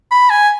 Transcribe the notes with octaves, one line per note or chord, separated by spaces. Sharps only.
B5
G#5